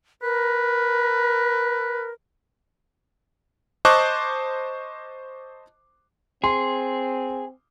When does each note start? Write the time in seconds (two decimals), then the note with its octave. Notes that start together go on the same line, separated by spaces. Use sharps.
0.22 A#4 B4
3.85 C5 D#5 A5 C#6 D6 F#6
6.44 C4 G#4 C6